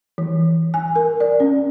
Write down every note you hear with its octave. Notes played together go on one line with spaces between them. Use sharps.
E3
G#5
A#4
D5
C#4